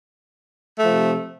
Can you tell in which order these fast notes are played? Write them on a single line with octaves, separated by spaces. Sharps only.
A3 F3 C3